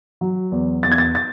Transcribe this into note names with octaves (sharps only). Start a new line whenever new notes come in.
F#3
E2
E2 A6
G#6
A6
A6